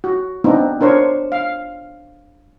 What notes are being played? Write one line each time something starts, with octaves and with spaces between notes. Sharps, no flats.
F#4
B3 C4 D4 D#4
D4 A#4 C5 C#5
F5